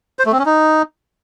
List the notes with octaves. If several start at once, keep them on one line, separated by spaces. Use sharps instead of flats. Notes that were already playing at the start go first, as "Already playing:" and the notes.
C5
A3
C4
C#4
D#4